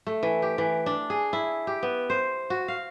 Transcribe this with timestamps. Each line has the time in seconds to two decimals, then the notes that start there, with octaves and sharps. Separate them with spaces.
0.07 A3
0.23 E3
0.42 G4
0.58 E3
0.86 D4
1.10 G#4
1.33 E4
1.67 G4
1.83 B3
2.10 C5
2.50 F#4
2.68 F5